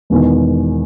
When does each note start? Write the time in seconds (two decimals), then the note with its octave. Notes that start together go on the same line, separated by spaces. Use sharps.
0.10 E1 E2 D#3